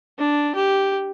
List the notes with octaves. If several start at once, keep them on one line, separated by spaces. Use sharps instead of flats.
D4
G4